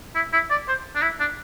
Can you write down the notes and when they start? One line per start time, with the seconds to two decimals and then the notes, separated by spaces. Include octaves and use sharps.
0.15 E4
0.33 E4
0.51 D5
0.68 C5
0.96 D4
1.02 E4
1.20 D4